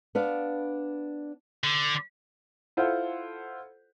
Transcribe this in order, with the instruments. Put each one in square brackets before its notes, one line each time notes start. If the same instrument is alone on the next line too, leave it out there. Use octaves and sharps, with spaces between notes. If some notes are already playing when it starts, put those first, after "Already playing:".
[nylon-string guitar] B3 D4 F5
[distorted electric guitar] D3
[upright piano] E4 F4 A4 C5 F#5